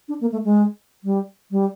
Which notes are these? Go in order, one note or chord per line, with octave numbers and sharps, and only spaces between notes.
D4
A#3
A3
G#3
G3
G3